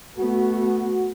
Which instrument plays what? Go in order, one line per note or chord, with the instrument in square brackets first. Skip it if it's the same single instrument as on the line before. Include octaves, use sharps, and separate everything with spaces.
[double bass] A3 B3 [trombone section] F#4